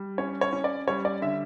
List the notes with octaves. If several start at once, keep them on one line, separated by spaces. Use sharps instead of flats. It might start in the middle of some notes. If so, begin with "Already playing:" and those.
Already playing: G3
C#4 C#5
C#5
C#4
D5
G3 C#5
D5
D3 E5